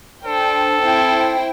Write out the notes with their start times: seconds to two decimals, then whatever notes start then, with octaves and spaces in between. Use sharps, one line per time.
0.24 D4 A4 C5 G5
0.82 C4 E4 C5 G5